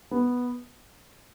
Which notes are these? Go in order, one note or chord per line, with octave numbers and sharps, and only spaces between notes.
B3